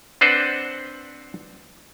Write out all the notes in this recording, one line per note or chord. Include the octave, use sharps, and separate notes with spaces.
C4 D4 B4 C5 F#5 A5